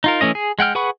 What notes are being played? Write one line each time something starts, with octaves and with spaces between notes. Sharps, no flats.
D#4 F4 A#4
E3 A3 C#4 D#5
G#4
G#3 F#5 G5 F6
G#4 B4 F#5 B5 C#6